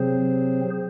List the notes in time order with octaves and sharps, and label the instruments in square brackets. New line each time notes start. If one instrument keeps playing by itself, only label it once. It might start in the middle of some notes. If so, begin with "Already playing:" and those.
Already playing: [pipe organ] C3 F#3 C4 G#4 C5